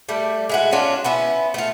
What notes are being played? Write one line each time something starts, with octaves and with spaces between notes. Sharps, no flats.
G3 A3
G#3 E4 F#4
C#4 D4 F4 F#4
B3 C#4 E4
A3 F4